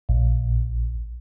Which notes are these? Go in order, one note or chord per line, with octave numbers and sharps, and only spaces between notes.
A#1